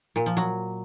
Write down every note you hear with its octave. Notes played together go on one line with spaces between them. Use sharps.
A#2
F3
F#3